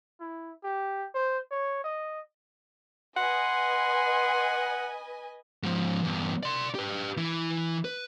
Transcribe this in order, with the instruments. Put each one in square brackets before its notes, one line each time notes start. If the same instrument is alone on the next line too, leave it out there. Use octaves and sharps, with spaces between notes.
[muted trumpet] E4
G4
C5
C#5
D#5
[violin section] B4 D#5 G#5 [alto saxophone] F#5 [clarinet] C6
[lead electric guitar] G#2 F3
E2 G2
D5 C6
G4 B4
E3 E4
B4